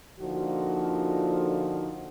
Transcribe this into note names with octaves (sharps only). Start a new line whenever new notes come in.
A#2 D3 F3 D#4 F#4